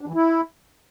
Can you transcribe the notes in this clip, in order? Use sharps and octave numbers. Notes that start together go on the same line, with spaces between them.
D4
E3
E4